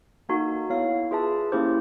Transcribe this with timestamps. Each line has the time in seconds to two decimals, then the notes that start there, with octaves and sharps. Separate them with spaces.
0.29 A#3 D#4 F#4 A4
0.70 B3 E4 A4 C#5 F5
1.11 F4 G#4 B4 E5 A5
1.52 A#3 C#4 E4 G4 C5